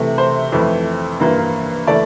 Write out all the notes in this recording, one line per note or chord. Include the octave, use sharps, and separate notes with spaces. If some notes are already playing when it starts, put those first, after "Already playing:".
Already playing: C3 E3 A3
C5
F2 E3 A3 E4
G2 E3 A#3 F4
E3 A3 D5